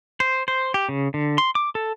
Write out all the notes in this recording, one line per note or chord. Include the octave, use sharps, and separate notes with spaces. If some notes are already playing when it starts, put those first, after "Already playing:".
C5
C5
G4
C#3
D3
C6
D6
A4